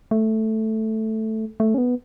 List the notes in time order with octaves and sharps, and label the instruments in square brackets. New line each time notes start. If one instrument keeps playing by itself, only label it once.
[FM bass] A3
A3
C#4
B3